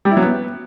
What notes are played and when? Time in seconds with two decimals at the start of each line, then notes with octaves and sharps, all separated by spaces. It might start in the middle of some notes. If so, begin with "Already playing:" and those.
0.05 G3
0.11 E4
0.17 F#3
0.22 B3